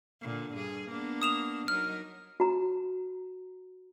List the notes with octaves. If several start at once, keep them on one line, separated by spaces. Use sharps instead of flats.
A#2 D3
G2 G#4
A#3 B3 D4
D#6 E7 F7
F#3 D#4 A#4 F6
F#4 A#5